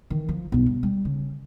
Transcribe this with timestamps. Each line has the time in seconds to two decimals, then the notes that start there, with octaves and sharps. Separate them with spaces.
0.10 D#3 E3
0.29 F3
0.52 B1 G2
0.66 G2
0.83 G3
1.05 C#3